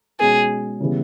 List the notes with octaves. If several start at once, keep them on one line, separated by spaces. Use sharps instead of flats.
B2 G#3 C#4 G#4
C#3 E3 G3 B3